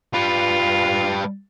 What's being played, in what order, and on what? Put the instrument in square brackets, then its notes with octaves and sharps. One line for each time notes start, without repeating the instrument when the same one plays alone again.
[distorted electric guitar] G3 B4 [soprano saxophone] F4